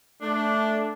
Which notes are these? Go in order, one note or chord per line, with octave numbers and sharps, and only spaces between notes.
A3 D4